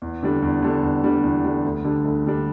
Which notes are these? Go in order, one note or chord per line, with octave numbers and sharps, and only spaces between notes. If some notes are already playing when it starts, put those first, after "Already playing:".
E2
D3 G3 D4
E2
D3 G3 D4
E2
D3 G3 D4
E2
D3 G3 D4
D2
D3 G3 D4
D2
D3 G3 D4